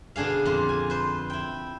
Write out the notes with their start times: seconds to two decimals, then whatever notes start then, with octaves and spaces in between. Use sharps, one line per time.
0.16 B2 D3 D4 G#4 F5
0.45 F2 A#2 F4
0.69 G#5
0.90 B4 C5
1.30 E4 G5